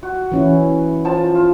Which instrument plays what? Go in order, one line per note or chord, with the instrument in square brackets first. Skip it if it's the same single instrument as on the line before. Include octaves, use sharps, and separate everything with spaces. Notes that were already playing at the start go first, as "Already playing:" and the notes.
[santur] F#4
[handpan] E3 C#4 E4
[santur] F3 A5
F4